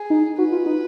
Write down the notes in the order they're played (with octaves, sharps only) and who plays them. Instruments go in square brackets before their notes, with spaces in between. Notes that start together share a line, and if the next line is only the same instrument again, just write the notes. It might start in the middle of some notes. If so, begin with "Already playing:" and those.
Already playing: [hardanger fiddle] G#4
[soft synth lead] D#4
[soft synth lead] F#4 [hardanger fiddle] B4
[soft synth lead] F4
D#4